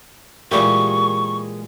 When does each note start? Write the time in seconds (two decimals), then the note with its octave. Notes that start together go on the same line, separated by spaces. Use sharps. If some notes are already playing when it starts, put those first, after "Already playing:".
0.51 A#2 E3 G#3 G4 A#4 C#6